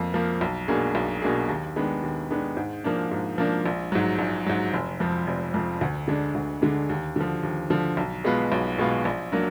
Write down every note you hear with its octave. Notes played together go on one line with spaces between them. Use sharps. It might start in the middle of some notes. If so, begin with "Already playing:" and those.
Already playing: F2 F3 A#3
F3 A#3
B1
B2 A#3 D4 G#4
B1
B2 A#3 D4 G#4
D#2
D#3 G#3 B3 D4
D#2
D#3 G#3 B3 D4
G#2
F3 A#3 D4
G#2
F3 A#3 D4
A#1
G#2 F#3
A#1
G#2 F#3
F1
F2 F3
F1
F2 F3
D2
D3 G#3 D4
D2
D3 G#3 D4
D#2
D3 F3
D#2
D3 F3
B1
B2 G#3 B3 F4
B1
B2 G#3 B3 F4
A#1
F#3 A#3 D4